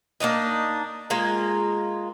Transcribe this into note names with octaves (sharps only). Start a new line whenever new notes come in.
A#3 D4 D#4 D#5
G#3 A#3 F4 A#4